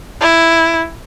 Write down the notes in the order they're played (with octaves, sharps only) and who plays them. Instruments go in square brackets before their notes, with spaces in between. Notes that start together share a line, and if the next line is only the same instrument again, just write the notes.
[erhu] E4